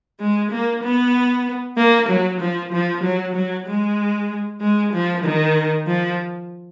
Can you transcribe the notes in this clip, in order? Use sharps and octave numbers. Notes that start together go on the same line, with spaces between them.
G#3
A#3
B3
A#3
F#3
F3
F3
F#3
F#3
G#3
G#3
F3
D#3
F3